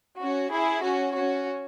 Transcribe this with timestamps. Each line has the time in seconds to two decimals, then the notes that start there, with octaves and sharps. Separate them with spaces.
0.20 C#4 F#4
0.51 E4 G#4
0.82 C#4 F#4
1.14 C#4 F#4